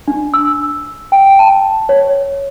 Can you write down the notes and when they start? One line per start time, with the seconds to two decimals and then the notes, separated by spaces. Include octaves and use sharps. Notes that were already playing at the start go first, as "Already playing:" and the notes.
0.08 D4
0.34 E6
1.12 G5
1.39 A5
1.89 C#5